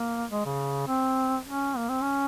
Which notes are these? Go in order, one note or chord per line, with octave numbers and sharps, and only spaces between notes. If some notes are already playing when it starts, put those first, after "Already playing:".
Already playing: A#3
G#3
C#3
C4
C#4
A#3
C4
C#4